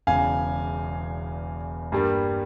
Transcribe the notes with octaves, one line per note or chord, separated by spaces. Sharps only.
E1 E2 C#3 F5 G#5
G2 G3 A#3